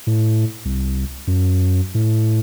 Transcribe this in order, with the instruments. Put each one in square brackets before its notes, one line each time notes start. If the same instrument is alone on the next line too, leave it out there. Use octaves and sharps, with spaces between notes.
[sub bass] A2
C2
F#2
A2